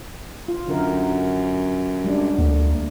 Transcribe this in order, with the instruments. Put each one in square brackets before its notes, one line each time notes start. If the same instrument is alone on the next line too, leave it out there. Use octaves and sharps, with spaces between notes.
[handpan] F4
[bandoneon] F#2 [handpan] D3 A#4
[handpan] G3 G#3 D4
[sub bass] D2 [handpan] A3 A#3